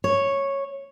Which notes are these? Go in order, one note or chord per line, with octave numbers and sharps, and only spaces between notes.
C#5